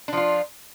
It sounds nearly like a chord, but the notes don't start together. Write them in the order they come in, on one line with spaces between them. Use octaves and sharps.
D4 F3 F4